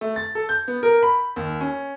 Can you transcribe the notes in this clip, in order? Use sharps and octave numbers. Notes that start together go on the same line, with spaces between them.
A3
A6
A4
G6
B3
A#4
B5
D#2
C#4